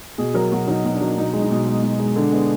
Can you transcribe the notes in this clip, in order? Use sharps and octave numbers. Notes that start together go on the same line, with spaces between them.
B2 G#4
F#3 A#4
B2 F#4
F#3 D#4
B2
D4
F#3
B2 D#4
G#3
D#4
B2
G#3
B2
G#3
D3 D4
G#3 B3